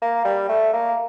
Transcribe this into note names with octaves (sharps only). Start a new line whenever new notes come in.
A#3
G3
A3
A#3